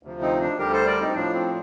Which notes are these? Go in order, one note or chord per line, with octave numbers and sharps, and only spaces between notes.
D2 C3 F3
C4 D#4
D4
D2 D3 G3 G4 A#4
A4 C5
A#4 D5
C4 D#4
A2 F3 D4
C4